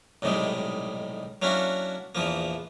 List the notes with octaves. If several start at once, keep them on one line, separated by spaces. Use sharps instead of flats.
B1 A2 C3 D#3 G3 G#3
F#3 A#3 C#4 D4 E4 F#4
A#1 E2 E3 F3 A#3